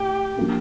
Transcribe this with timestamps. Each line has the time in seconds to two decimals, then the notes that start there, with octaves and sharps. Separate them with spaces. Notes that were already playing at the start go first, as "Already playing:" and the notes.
Already playing: A2 G4
0.37 F3 A#3 D4